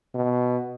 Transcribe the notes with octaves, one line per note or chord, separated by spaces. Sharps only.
B2